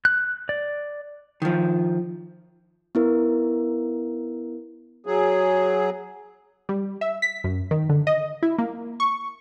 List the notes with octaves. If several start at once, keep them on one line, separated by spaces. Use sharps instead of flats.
F#6
D5
D#3 F3
B3 E4 A#4
F#3 G#4
G3
E5
B6
F#2
D#3
D3
D#5
E4
A#3
C#6